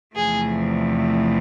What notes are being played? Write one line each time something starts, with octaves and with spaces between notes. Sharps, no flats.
E2 C3 F3 A3 G#4